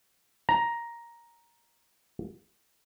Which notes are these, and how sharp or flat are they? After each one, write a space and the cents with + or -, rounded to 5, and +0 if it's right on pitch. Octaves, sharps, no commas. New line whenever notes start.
A#5 +5